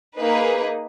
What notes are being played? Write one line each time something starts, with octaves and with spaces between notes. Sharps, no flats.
A#3 D#4 G#4 B4